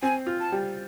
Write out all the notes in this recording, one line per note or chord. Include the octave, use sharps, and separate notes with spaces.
C4 G#5
F4
A5
G3